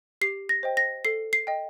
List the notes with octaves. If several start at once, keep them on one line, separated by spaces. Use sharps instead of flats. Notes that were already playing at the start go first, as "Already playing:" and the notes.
G4 C7
A#6
C5 D#5 G5
A#6
A4 C7
C7
D#5 G5